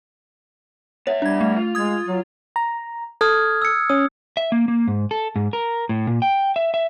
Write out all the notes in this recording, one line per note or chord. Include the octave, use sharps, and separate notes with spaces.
B3 C#5 E5
G3 D4 G#6
A3
F4
G#3 D#6 G#6
F#3
A#5
A4 D#6 F6 G#6
E6 C#7
C#4 D#6
E5
A#3
A#3
G#2
A4
G#2
A#4
A2
A#2
G5
E5
E5